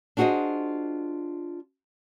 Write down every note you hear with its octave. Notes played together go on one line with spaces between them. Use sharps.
D4 F4 F#4 G#4 C5 D#5